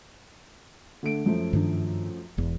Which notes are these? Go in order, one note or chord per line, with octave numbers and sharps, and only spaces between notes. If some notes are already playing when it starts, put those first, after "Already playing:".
D3 A3 D7
F#2 F3 A3
G2 D#3 D4
E1 E2